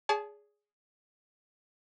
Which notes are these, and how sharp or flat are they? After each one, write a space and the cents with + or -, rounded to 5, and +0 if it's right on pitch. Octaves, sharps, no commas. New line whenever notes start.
G#4 +0 D5 -45 A5 -35